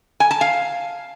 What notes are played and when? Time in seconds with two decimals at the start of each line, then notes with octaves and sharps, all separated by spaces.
0.20 G#5
0.31 A5
0.41 F5